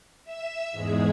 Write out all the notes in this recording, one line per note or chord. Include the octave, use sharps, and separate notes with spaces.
E5 E6
E2 G#2 G#3 G#4